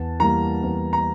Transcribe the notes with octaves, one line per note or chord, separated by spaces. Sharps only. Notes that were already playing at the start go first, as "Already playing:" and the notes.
Already playing: E2 A5
E3 G3 A#3 A#5
E2
A#5